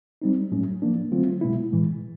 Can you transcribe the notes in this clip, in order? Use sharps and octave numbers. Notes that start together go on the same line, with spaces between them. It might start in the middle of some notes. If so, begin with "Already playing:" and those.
G3 C4 D#4
A2 F#3 A3 C#4
F3 A#3 D4
D3 F#3 A3 C4 F4
B2 G#3 B3 E4
A2 E3 G#3